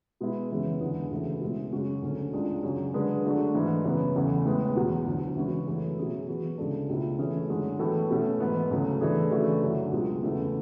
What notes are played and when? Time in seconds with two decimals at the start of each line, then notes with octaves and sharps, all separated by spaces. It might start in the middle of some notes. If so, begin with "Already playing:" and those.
0.21 B2 G#3 B3 E4
0.50 F#2 C#3 E3 G#3 B3
0.81 E2 D3 G#3 B3
1.11 D2 C#3 E3 A3 E4
1.41 B2 G#3 C#4
1.73 F#2 C#3 G#3 C#4 F#4
2.02 D2 D3 A3 C#4
2.33 C#2 C#3 G#3 D4
2.63 F#2 C#3 F#3
2.94 D3 G#3 D4 G#4 B4
3.24 D3 F#3 A3 D4 F#4
3.54 G#2 E3 A3
3.84 F#2 C#3 E3 B3
4.16 E2 C#3 E3 A3
4.45 A2 G#3 B3
4.76 E2 B2 F#3
5.06 D2 D3 F#3
5.37 C#3 E3 G#3 C#4 F#4
5.67 F#2 E3 A3 E4
5.98 B2 F#3 C#4 G#4
6.27 E3 B3 F#4
6.58 D2 C#3 G#3 D4 A4
6.89 C#2 B2 A3 E4
7.19 E3 A3 C#4 G#4
7.49 F#2 D3 G#3
7.79 A2 E3 B3 F#4 A4
8.10 B2 A3 C#4
8.40 G#2 E3 B3
8.71 D2 C#3 F#3 A3
9.01 E3 A3 D4 G#4
9.31 C#3 E3 A3 D4 F#4
9.62 F#2 D3 F#3
9.92 C#2 B2 G#3
10.22 E2 C#3 E3 A3 C#4